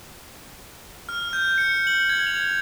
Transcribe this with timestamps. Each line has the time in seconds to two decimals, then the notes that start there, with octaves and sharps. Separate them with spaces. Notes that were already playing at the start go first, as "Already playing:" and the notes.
1.09 F6
1.33 G6
1.58 C#7
1.87 F#7
2.09 G#6
2.26 F7